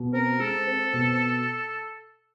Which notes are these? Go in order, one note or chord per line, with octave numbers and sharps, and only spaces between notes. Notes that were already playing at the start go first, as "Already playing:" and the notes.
Already playing: B2
C4 A#4
G#3 A4
C4
B2